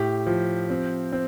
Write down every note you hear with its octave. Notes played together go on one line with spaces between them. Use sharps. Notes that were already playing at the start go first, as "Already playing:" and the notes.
Already playing: A2 G4
F3
C4
C4